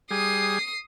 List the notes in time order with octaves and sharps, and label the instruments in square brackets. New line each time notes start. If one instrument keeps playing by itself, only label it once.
[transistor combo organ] G3 G#4 [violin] D#6 C7